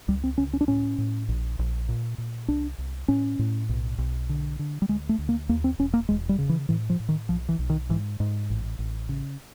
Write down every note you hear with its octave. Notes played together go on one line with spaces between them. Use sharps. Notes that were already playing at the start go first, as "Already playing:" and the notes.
C#2 G3
C4
C#2 C#4
C#4
D4
A2 C#4
A2
A#1
A#1
A#2
A#2
C2 D4
C2
A2 C#4
A2
B1
B1
D3
D3
G3
D2 G#3
A3
D2
A#3
D#2 A#3
C4
E1 C#4
A#3
E1 G#3
G3
C#3
E3
A2 E3
F3
A2
D#3
B1 F3
E3
B1
D#3
G#2 E3
G#2
A1
A1
C#3